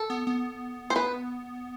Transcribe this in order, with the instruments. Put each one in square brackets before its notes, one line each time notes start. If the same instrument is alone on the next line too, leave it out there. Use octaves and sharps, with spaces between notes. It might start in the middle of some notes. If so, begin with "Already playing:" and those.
Already playing: [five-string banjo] A4
[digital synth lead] B3
B3
[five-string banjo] C5
B4